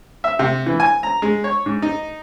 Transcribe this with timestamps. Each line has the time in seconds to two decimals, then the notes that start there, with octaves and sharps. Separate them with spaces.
0.24 E5
0.39 C3
0.66 E3
0.80 G#5
1.03 A#5
1.22 G#3
1.44 C#5
1.66 G#2
1.82 D#4